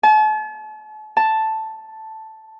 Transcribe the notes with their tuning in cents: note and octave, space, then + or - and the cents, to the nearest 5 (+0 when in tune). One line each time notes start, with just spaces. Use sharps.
A5 -40
A5 +0